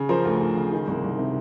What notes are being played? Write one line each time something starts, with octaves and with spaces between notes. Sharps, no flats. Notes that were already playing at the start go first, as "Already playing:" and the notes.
Already playing: C#3
F3 A#4 C5
D2
D2
C#3
D#3
C2
C2
C3